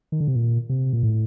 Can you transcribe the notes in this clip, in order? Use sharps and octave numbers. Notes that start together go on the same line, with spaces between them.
D#3
D3
C3
A#2
C3
A#2
A2